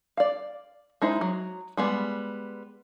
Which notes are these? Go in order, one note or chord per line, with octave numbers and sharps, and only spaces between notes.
D5 F5
G#3 D#4 E4 C5
F#3
G3 G#3 B3